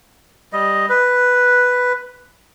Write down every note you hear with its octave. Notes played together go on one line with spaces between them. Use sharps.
G3 D#5
B4